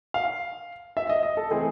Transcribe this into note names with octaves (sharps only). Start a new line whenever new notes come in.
F5
E5
D#5
D#5
A4
E3 A3 C4 G#4